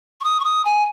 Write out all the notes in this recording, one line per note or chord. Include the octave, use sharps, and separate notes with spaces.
C#6
D#6
C#6
D#6
G#5